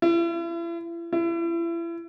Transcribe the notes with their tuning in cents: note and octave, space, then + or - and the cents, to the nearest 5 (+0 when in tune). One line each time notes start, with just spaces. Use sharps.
E4 +40
E4 +35